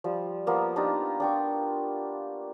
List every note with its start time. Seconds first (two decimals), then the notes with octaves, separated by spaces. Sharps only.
0.04 F3 G3
0.47 F3 A#3 B3
0.76 D4 D#4 F4 G4
1.20 D4 G5 C#6